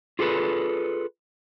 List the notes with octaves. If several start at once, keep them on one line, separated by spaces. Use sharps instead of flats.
F4 G#4 A4 B4